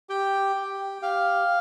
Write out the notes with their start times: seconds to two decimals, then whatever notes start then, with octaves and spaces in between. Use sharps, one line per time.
0.10 G4 G5
0.56 G4
1.02 G4 F5